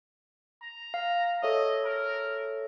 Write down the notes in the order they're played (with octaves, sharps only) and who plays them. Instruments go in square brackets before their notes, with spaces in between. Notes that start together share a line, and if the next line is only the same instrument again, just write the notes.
[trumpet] A#5
[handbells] F5
[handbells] A4 C#5 E5 [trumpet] D#5
[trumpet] A#4